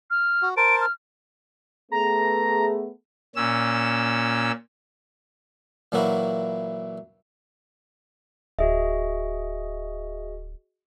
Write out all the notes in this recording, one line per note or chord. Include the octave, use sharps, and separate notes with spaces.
F6
F#4
A#4 C5 A5 D7
F6
A3 B3 G#4 A#5
A#2 C#4 E6
A#2 E3 F#3 A#3 E4 F#4
D1 F#4 G#4 D#5 E5